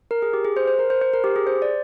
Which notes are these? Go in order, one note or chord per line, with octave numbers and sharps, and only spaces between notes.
A#4
G#4
G4
G#4
C5
C5
A#4
C5
C5
A#4
G4
G#4
C5
D5